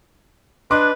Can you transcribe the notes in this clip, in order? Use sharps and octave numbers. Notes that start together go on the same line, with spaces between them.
D4 B4 D#5 C6 D6